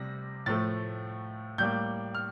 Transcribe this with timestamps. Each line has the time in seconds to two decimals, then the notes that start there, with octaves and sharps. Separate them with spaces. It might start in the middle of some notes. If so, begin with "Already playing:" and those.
Already playing: C3 G3 A#6
0.46 A2 F3 A3 A6
1.58 A2 G3 A#3 G6
2.15 F6